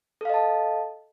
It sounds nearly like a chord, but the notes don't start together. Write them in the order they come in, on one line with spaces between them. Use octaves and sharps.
A4 F5 D#5 A5